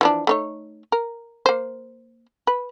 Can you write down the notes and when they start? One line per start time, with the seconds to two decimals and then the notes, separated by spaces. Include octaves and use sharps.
0.01 E3 F3 D4
0.27 A3 D#4 C#5
0.92 A#4
1.46 A#3 C5
2.47 B4